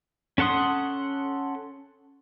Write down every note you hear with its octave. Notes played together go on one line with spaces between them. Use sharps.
C#4 A4 F#5 C6 D#6